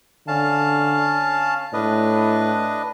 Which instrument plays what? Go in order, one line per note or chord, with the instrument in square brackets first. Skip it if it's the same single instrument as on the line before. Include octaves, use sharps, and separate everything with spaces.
[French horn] D3 [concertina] C#4 F5 A5
[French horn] A2 [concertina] D4 B4 D#5